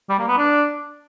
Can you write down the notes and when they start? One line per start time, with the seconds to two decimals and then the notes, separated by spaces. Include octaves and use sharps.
0.09 G3
0.18 A#3
0.28 B3
0.37 D4